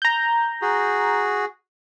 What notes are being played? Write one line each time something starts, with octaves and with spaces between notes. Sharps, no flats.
A#5 G6
F#4 G#4